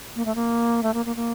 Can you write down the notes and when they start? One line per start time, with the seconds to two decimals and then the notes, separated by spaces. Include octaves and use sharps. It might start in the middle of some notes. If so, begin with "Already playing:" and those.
0.16 A#3
0.25 A3
0.35 A#3
0.83 A3
0.94 A#3
1.06 A#3
1.16 A#3